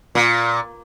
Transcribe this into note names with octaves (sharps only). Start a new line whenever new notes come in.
A#2